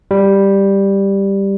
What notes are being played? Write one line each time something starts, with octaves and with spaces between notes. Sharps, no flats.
G3